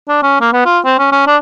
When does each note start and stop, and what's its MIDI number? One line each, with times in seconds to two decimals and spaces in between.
0.09 0.22 62
0.23 0.37 61
0.41 0.51 58
0.53 0.65 59
0.66 0.79 65
0.85 0.94 60
0.99 1.10 61
1.12 1.23 61
1.27 1.37 62